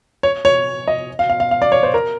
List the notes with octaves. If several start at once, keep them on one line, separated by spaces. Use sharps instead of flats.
C#5
C#5
D#5
F5
F5
F5
F5
D5
C#5
C5
A#4